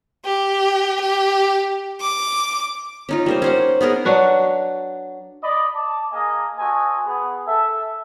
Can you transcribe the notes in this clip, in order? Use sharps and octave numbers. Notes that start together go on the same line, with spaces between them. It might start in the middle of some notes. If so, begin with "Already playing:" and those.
G4
G4
D6
C#4 D#4 F4
G3 A#3 C5
C#4 C5 F#5
B3 D#4 G#4 A#4
F#3 D4 F#4 B4
D5 D#5 B5
A5 D6
A#3 G#4 A#4 D#5 G#5 A#5
F#4 A4 C5 D#5 G#5
B3 G#4
A4 E5